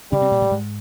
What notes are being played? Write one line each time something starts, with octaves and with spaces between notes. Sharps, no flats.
C#3 G3 C#4
C3 C4
A#2 A#3
A2 A3
G#2 G#3